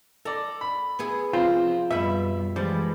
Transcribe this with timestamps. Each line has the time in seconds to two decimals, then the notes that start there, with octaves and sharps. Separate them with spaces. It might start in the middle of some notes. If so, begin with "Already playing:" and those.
0.25 A4 D5 A#5
0.61 B5
0.99 B3 E4 G#4
1.33 C3 F3 C4 F4
1.91 F#2 B2 G3 E5 B5
2.56 E3 F3 G3 G#3